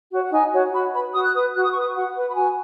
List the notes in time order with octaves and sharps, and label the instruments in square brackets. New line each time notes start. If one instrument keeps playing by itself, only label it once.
[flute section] F#4 C#5
F#5
D#4 G#5
F#4 C#5
F#4 B5
B4 B5
F#4 D#6
F#6
B4 D#6
F#4 F#6
D#6
C#6
B4 D#6
F#4 F#5
B4
B5
F#4 G#5